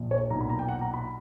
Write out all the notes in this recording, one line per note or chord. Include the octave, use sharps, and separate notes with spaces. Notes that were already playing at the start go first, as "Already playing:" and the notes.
Already playing: A#1 A#2
C#5
B1 A#2 A#5
B5
A#5
G5
F#5
A#5
B5